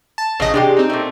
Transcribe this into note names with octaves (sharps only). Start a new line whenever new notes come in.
A5
A1 C#3 D#4 D#5
C3 G#3 D4 G4
C4 D#4
A#2 A3